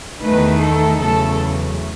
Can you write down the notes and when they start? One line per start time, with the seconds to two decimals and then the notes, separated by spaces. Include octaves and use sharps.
0.21 E2 D#3 A3 D#4 B4
0.59 A4
0.98 E2 C#3 F#3 A3 A4